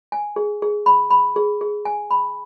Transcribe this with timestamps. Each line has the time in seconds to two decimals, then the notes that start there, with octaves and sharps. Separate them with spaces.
0.12 G#5
0.36 G#4
0.62 G#4
0.86 B5
1.11 B5
1.36 G#4
1.61 G#4
1.85 G#5
2.11 B5